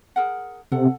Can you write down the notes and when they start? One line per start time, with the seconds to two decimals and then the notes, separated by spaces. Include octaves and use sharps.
0.16 G#4 A#4 F#5
0.72 C3 A4 F#5